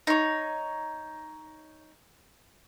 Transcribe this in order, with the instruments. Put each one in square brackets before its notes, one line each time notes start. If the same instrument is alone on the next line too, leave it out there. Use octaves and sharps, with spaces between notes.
[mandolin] D#4 C#5